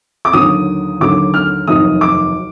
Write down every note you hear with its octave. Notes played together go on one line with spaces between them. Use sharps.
D6
D#2 D3 F#3 D#6
D#2 D3 F#3 D6
F6
F1 D#2 D#3 F#3 D#6
D6